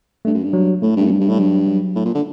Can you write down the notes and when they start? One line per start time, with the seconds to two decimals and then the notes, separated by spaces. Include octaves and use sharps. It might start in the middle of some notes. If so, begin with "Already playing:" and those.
0.25 G2 A3
0.34 F#2
0.44 G2
0.53 F#3
0.82 A2 A3
0.96 G2 A3
1.05 F#2
1.10 G2 G3
1.20 G2
1.29 A2 G3
1.39 G2 F#3
1.67 F#3
1.95 A2
2.05 A#2
2.15 D3